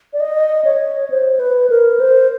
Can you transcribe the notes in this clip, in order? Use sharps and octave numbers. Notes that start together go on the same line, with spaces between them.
D5
D#5
C#5
C5
B4
A#4
C5